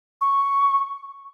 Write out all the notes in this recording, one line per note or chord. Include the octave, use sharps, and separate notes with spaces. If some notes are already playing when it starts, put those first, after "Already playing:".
C#6